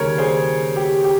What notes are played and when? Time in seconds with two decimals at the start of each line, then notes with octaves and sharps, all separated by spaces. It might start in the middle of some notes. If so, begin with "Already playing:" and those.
Already playing: D#2 C#3 G3 C#4 A#4 C#5
0.18 G#4 C5
0.76 G4
1.04 G4